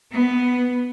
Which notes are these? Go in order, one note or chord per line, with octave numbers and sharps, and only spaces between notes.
B3